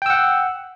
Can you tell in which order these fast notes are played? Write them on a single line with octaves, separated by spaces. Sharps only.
G5 E6 F#5